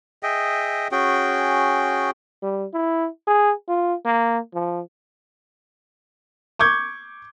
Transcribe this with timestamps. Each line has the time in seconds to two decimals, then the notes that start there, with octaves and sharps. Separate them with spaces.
0.23 G#4 D#5 E5 G5
0.92 C#4 F#4 G#4 G5
2.43 G3
2.74 E4
3.27 G#4
3.68 F4
4.05 A#3
4.54 F3
6.59 C#6 D6 G6 G#6